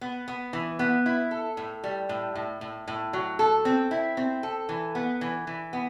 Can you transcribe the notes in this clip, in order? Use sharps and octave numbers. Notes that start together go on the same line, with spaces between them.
B3
B3
E3
B3
E4
A4
A2
G3
A2
A2
A2
A2
F#3
A4
C4
E4
C4
A4
E3
B3
E3
E3
B3